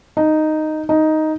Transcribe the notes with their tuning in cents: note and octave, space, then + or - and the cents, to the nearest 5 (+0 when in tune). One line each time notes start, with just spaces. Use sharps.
D#4 -5
D#4 +5